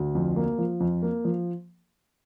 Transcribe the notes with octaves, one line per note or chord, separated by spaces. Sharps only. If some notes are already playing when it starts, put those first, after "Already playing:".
Already playing: D2
F2
A#3
F3
F2
A#3
F3